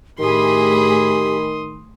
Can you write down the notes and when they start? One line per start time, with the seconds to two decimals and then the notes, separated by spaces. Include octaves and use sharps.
0.19 A2 D#3 G4 G#4 B5 C6 D#6